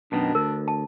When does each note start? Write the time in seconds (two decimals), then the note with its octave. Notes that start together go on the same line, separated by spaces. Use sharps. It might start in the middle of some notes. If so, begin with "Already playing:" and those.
0.12 F#2 B2 D#3 D4
0.35 D2 A#4
0.68 A5